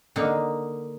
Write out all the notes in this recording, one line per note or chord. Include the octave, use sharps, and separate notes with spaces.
D3 A#3 D#4